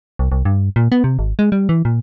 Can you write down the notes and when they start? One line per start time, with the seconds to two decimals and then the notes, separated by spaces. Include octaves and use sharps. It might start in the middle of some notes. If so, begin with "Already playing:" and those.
0.19 C2
0.32 C2
0.45 G2
0.76 A#2
0.92 B3
1.04 C3
1.19 G#1
1.39 G#3
1.52 G3
1.69 E3
1.85 A#2